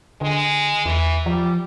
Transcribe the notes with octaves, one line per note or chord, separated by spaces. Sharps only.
D3 G#3
E2 E3
F3 G3